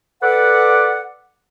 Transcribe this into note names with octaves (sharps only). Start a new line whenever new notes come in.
A4 B4 D5 F#5